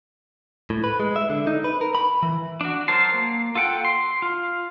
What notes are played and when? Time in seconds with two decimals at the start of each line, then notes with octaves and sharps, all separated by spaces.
0.70 A2
0.84 B4
1.00 G#3
1.16 E5
1.30 D3
1.47 D#4
1.64 B4
1.81 A#4
1.95 B5
2.23 E3
2.61 D4 F#4
2.88 F#3 A#4 C5 A5 C6
3.14 A#3
3.55 F4 A4 F#5 G5
3.85 C6
4.22 F4